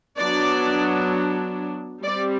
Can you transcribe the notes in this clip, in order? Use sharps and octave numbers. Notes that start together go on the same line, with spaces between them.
F#3 B3 D4 D5
G3 C4 D5